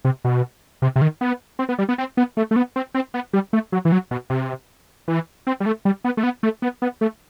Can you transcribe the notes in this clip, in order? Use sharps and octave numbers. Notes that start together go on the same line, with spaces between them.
C3
B2
C3
C3
D#3
B3
C4
B3
G3
B3
C4
B3
A3
A3
B3
C4
C4
B3
G3
A3
F#3
E3
F#3
B2
C3
E3
C4
G3
A3
G3
B3
A3
B3
A3
B3
B3
A3